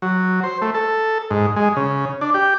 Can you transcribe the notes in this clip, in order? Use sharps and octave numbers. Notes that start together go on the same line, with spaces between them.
F#3
C5
A3
A4
G#2
G#3
C#3
D4
G4